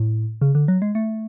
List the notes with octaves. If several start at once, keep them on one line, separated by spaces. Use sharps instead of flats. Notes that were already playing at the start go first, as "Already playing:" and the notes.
Already playing: A2
C#3
D3
F#3
G#3
A3